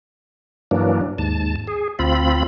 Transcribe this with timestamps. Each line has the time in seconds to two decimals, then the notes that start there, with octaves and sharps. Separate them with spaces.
0.71 G2 E3 F#3 A#3 D4
1.18 D#2 G#2 A5
1.67 G#4
1.99 D2 C4 F4 B5